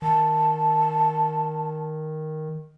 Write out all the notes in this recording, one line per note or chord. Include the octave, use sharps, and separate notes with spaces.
D#3 A5